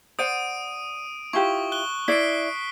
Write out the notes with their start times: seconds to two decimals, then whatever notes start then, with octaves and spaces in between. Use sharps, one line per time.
0.19 C5 D5 F#5 D#6 D7 D#7
1.33 E4 F4 G4 C#6 G7
1.72 F#6 G7
2.08 E4 D5 B6 C7 D7